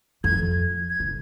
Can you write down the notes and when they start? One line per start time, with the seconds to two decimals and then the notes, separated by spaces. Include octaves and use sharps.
0.24 F2 G#6
0.90 G#6
1.00 C3